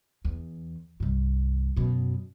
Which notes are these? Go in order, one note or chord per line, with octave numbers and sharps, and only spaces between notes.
E2
C2 G2
F#2 B2